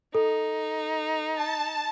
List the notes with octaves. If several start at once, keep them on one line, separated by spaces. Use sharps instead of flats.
D#4 A4
A5